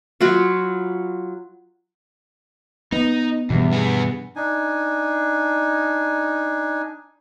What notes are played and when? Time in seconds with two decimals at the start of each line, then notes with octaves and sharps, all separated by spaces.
0.21 F#3 F4 F#4 B5
2.92 B3 D#4
3.50 E2 G2 B2
3.73 B3 G#4
4.36 D4 D#4 G#5